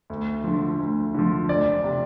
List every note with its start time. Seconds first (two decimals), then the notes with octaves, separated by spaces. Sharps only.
0.10 D2
0.44 D3 F3
0.79 D2
1.14 D3 F3
1.49 F1 D5
1.84 C3